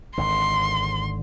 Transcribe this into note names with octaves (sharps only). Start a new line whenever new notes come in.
G#1 D3 C6